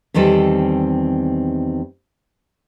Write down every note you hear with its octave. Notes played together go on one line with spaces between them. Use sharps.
E2 D#3 G3 C4 A4 B4